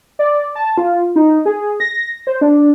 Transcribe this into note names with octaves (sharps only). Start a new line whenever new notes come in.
D5
A5
F4
D#4
G#4
A#6
C5
D4